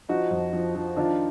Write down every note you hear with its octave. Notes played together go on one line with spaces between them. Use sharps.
F3 D#4 F#4
F2
F3
F3
D#3 D4 F4